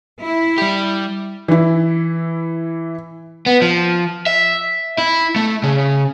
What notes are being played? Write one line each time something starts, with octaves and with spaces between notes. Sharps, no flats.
E4
G3 G4
E3 E4
B3
F3
E5
E4
A3
C#3